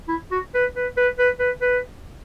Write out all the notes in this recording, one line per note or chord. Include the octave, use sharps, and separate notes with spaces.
E4
F#4
B4
B4
B4
B4
B4
B4